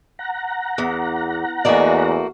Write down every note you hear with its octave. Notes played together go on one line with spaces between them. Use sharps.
F#5 A#5
E2
E2 A3 A#3 F#4 D5 D#5 G#5